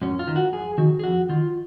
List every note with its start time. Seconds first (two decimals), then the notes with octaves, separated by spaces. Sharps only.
0.01 F#2 C#4
0.19 F4
0.27 D#3
0.36 F#4
0.53 F#2 G#4
0.78 D#3 F#4
0.99 G#4
1.04 F2 F#4
1.29 D#3 F4